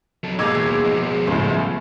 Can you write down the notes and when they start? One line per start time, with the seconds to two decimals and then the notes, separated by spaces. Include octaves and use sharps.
0.24 F#3 A4
0.39 B2 G#3 A#3 D#4 F5 D6 E6 G#6
0.55 E2
0.84 F3 F#4
1.27 C#2 A2 C5